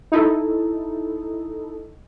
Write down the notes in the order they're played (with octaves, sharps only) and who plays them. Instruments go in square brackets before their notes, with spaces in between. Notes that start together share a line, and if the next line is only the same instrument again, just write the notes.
[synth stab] D#4 E4 A4